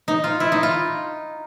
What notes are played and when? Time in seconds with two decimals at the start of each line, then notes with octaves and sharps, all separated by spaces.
0.08 D#4
0.24 F4
0.40 E4
0.52 D#4
0.63 F4